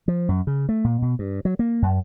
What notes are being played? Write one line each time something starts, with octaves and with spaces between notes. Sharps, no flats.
F3
F#2
C#3
A3
A#2
B2
G2
F#3
A#3
F#2